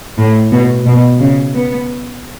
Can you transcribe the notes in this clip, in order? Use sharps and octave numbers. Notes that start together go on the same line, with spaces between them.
A2
B2
B2
C#3
B3